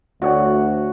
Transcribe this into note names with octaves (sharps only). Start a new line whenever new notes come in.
D2 F#4 C#5 D5 F#5